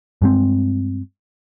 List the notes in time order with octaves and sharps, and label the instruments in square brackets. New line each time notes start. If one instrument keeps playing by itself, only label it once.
[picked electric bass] G2 G#3 C4